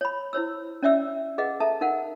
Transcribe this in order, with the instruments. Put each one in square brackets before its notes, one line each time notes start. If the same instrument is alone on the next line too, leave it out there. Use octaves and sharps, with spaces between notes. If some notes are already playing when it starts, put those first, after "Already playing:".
[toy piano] C#5 B5
E4 C5 C#5 E6
C#4 C#5 D5 E5 G5 E6
G#4 B4 D#5 F5 F#5
A4 E5 A5 A#5
D#4 A#4 F5 F#5